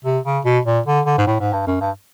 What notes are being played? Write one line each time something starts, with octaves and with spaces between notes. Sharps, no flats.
C3
C#3
B2
A#2
D3
D3
G#2
A2
G#2
G2
F#2
G2